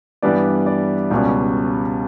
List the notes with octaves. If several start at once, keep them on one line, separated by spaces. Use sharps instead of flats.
G2 E3 G3 B3 D4 D5
D5
C#2 B2 G3 C#4 D5